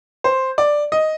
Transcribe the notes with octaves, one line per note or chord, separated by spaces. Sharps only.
C5
D5
D#5